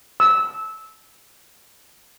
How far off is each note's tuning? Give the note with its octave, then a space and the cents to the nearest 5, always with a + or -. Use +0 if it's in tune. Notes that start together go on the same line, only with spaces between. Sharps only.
E6 -20